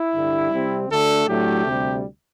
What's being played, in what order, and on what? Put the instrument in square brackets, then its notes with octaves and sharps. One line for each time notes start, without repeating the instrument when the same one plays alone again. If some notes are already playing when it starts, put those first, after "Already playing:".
Already playing: [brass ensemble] E4
G2 D3 G3
C3 G3 C4
D2 D3 A3 D4 A4
A2 F#3 A3 D4 G4
D2 C3 G3